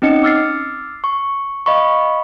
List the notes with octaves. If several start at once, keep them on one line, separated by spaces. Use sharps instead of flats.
C4 C#4 D#4 D#5 C#7
D6 E6 F6 A6 C7
C#6
D#5 F5 B5 C#6